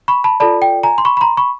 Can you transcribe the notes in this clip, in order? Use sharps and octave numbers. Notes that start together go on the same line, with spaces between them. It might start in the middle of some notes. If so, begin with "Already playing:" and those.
B5 C#6
A5 B5
F4 A4 D5 A5 B5
G5
G#5 A#5
C6
B5 C#6
B5
A#5 C6
B5 C#6